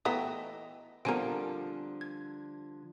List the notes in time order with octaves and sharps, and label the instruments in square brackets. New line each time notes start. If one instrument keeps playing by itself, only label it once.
[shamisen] E3 A3 B3 [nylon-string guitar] D#5 E5 G5 [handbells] A#5 D#6
[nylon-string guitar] D3 F3 G3 [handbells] B3 G#5 D7 [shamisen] C4 A#4
[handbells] G#6